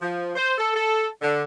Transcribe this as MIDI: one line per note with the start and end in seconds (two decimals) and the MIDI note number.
0.02 0.31 53
0.36 0.53 72
0.58 0.73 69
0.74 1.06 69
1.22 1.42 50